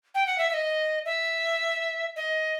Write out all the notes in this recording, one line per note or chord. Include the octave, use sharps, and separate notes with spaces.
G5
F#5
E5
E5
D#5
E5
D#5